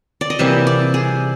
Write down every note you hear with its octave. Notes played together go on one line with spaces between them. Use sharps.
D5
D#5
C3 E3 G3 A#3 E5
D5
G#4